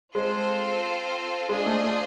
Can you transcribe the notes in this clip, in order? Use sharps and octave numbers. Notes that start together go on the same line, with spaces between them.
G#3 C4 F4 A4 C5
G#3 D4 F4 G#4 C5 D#5
A3
A3